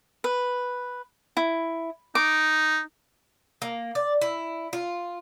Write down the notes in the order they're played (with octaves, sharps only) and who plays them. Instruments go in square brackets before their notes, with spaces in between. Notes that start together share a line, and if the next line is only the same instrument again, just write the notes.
[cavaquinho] B4
E4
[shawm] D#4 [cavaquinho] D6
[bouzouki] A#3
D5
E4
F4